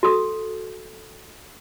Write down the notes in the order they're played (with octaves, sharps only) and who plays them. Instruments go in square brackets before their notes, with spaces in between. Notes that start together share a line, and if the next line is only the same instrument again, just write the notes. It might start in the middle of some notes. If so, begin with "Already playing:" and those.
[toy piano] F#4 A4 D#6